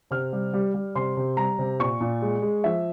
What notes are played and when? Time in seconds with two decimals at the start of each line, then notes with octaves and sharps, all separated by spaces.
0.11 C3 F6
0.33 G3
0.53 G3
0.74 G3
0.95 C3 C6
1.17 C3
1.37 G3 A#5
1.59 C3
1.79 A#2 C#6
2.00 A#2
2.22 G#3
2.42 G#3
2.64 F3 E5